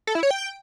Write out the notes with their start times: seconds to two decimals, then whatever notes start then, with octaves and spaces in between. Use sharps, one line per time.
0.07 A4
0.15 E4
0.23 C#5
0.31 G5